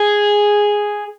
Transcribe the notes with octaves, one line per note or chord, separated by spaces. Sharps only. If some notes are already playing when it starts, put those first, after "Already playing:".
Already playing: G#4